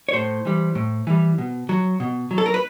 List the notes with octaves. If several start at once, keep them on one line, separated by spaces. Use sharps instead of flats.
C#5
A2 C5
E3 G3
A2
E3 G3
B2
F#3
B2
F#3
A4
A#4
B4